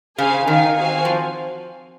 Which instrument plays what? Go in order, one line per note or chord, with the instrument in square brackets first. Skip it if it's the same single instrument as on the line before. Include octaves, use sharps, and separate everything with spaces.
[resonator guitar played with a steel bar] C#3 [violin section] G#4 C5 F5 G#5
[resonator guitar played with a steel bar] D#3 [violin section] D#4 A#4 F5 G#5
[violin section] C4 F#4 C5 F5 G#5
[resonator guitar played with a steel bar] F3